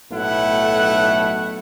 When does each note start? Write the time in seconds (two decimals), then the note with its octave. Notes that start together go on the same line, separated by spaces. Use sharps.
0.11 B1 A2 A3 E4 F#5